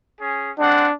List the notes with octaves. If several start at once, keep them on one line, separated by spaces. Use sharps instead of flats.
C#4 G#4
G#3 C4 D4 F#5